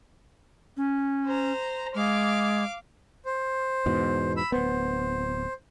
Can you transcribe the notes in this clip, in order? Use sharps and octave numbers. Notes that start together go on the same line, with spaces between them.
C#4
C5 A#5
G#3 F5 D6
C5
E2 G#2 B2
B5 E6
D1 B3 C5